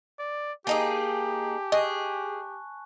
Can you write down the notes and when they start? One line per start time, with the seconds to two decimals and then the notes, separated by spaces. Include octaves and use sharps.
0.19 D5
0.67 A#3 D#4 G4 G#4 G#5 A5
1.72 G#4 D#5 C#6 F#6